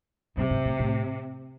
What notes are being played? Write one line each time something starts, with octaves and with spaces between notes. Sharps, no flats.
G2 C3
G#2
A2
A2